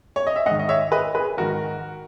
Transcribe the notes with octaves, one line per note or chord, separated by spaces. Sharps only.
C#5
D#5
E5
G#2 D#3 D#5 F#5
D#5
C#5 E5
B4 D#5
G#4 B4
G#2 D#3 F#4 A#4